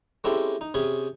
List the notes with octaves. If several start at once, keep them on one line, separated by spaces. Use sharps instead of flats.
G#3 C4 C#4 E4 G4 A4
D#4
C3 C#4 G#4 B5